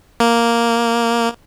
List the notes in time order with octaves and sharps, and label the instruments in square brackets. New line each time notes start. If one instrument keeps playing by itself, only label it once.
[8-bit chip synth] A#3